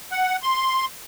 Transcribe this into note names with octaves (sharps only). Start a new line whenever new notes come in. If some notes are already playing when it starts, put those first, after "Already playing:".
F#5
C6